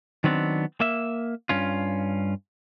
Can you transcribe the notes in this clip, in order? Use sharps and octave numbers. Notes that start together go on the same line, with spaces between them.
D#3 F#3 B3 C4 D4
A#3 E5
G2 C#4 F4